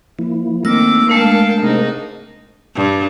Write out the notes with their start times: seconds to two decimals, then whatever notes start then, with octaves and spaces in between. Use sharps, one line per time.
0.19 F3 A#3 E4
0.65 D#3 A3 A#3 C4 D6 E6
1.10 G#3 A3 D4 A#4 F5 G5 A5
1.60 G#2 C3 D#4
2.76 G2